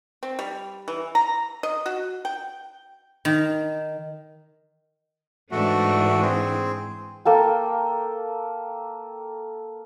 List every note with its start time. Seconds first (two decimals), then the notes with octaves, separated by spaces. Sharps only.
0.23 C4
0.39 G3
0.88 E3
1.15 A#5
1.63 D#5
1.86 F#4
2.25 G5
3.25 D#3
5.51 G#2 E3 A3 D4 F#4
6.22 C4 G#4
7.25 A#3 A4 G5